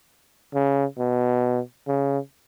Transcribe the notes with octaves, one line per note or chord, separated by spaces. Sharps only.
C#3
B2
C#3